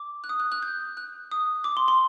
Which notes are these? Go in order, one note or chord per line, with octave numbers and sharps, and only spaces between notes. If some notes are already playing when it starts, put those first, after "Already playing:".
Already playing: D6
F#6
D#6
F#6
F#6
G6
F#6
D#6
D6
C6
C6